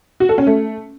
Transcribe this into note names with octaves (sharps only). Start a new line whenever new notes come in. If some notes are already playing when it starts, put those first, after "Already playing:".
F#4
A4
C#4
A3